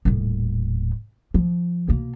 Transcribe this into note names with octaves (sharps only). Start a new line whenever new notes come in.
D#1 A2
F3
B2 A#3